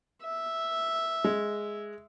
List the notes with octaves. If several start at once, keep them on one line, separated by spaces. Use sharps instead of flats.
E5
G#3